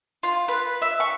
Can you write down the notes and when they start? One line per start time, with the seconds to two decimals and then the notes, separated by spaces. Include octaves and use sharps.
0.23 F4
0.48 B4
0.82 E5
1.00 C#6